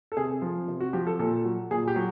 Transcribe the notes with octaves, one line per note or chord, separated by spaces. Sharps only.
A4
C3 G#4
F3
C3
F#4
F3 G4
A4
A#2 A4
F#3
A#2 G#4
G4
F#3